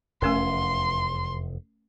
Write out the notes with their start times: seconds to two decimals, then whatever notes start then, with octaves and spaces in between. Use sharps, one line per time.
0.22 F1 E2 A3 C#4 A#4 C6